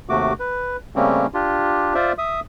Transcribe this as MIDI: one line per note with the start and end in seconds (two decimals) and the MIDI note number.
0.09 0.33 39
0.09 0.33 48
0.09 0.33 57
0.09 0.33 66
0.09 0.33 86
0.40 0.76 71
0.96 1.27 49
0.96 1.27 55
0.96 1.27 57
0.96 1.27 58
0.96 1.27 60
0.96 1.27 61
1.34 1.94 62
1.34 1.94 65
1.34 1.94 67
1.95 2.12 65
1.95 2.12 72
1.95 2.12 74
1.95 2.12 76
2.18 2.40 76
2.18 2.40 87